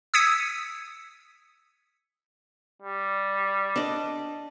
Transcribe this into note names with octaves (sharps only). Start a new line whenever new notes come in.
D#6 E6 G#6 B6 C#7 D#7
G3
D4 D#5